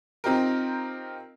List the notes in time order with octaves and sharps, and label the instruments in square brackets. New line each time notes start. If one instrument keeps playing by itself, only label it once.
[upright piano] C4 D#4 F4 G4 A#4